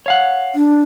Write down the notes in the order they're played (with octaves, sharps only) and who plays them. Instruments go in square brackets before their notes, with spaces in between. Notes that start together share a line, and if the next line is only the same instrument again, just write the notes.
[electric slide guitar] C#5 F5 F#5
[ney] D4